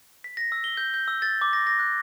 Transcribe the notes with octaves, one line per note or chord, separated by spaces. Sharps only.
B6
A#6
E6
G7
G6
G6
E6
A6
D6
A#6
A#6
F#6